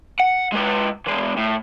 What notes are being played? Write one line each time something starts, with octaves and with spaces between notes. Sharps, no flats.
F#5
G#3 B4
E3 G#3
A2